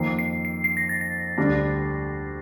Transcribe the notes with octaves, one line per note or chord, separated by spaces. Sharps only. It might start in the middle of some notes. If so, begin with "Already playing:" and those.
Already playing: F2 D#3 A#3 C7
C7
C7
C7
A#6
A6
A#6
D2 D3 G3 D4